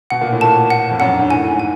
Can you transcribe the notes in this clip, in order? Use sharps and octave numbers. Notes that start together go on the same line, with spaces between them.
B2 F#5
A#2
A2
A#2 A5
F#5
F2
F#2 F#5
G2
G#2
A2 G#5
G#2
G#5